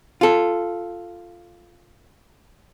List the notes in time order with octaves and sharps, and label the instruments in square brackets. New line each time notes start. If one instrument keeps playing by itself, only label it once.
[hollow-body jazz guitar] F4 A4